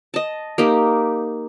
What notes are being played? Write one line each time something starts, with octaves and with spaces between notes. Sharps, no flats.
D#5 A5
A#3 D#4 G4